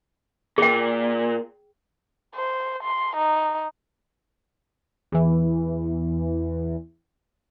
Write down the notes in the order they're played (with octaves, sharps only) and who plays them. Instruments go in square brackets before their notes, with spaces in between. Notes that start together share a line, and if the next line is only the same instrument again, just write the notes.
[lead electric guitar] A#2 [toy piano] G#4 G5
[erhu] C5
C6
D#4
[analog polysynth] E2 E3